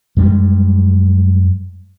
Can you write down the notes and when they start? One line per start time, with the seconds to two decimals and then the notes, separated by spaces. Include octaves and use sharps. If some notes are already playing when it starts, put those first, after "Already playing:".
0.17 F#2 G3 G#3